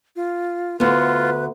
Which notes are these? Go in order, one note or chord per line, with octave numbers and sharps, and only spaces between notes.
F4
D2 B3 F4 B4